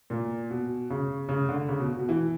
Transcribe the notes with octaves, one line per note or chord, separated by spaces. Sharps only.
A#2
B2
C#3
C#3
D3
C#3
B2
B2
E3